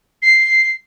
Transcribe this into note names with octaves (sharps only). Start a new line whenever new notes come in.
C7